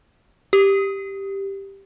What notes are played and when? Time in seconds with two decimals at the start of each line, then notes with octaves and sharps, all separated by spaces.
0.53 G4